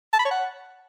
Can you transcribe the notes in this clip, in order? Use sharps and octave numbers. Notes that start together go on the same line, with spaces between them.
A5
B5
C#5
F#5